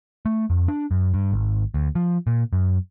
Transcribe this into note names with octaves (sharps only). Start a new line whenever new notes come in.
A3
F2
D4
F#2
G2
G#1
D2
F3
A#2
F#2